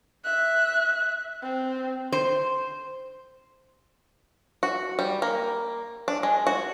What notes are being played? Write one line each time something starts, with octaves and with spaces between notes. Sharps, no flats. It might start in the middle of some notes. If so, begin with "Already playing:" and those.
E5 F#6
C4
C5
F#4
G3
A#3
D4
G#3
F#4